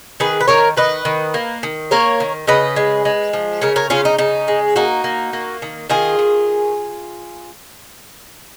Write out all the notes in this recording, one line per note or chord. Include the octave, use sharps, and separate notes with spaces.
D#3 G#4 B4
B4
D#3 A#4 C#5
D#3 B4 D#5
D#3
A#3
D#3
A#3 A#4 C#5
D#3
C#3 B4 D#5
G#3
G#3
F3
C#3 A#4 C#5
A#4 C#5
C#3 C#4 F4
D#4
C#3 D#4
G#3
A#3 D#4 F#4
A#3
A#3
D#3
D#3 F4 G#4
D#3